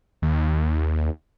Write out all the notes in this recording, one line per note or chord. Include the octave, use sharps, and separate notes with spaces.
D#2